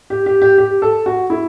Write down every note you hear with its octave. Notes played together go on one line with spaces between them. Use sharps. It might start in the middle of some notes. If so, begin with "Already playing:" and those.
G4
G4
G4
G4
A4
F#4
E4